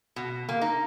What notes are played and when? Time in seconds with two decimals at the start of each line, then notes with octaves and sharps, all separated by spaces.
0.16 B2
0.49 A#3
0.61 D#4